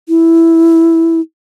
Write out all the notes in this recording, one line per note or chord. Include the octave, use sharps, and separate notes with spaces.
E4